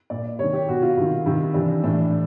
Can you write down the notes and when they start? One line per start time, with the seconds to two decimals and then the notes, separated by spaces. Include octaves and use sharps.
0.10 A#2 D5
0.39 C3 D#3 C#5
0.53 G4
0.68 B2 F#4
0.82 F4
0.97 C3 D#3
1.26 C3 D#3
1.54 C3 E3 D4
1.83 A2 E3 D4